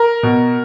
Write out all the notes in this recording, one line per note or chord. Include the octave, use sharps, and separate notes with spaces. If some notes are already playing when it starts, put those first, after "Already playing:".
Already playing: A#4
B2